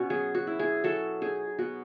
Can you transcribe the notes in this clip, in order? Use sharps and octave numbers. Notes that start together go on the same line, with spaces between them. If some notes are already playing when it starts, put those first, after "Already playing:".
Already playing: B2 C#4 F#4
F#3 G#4
F#4
E4
G#4
F#3 F#4 A4
D#4 G#4
B2 F#4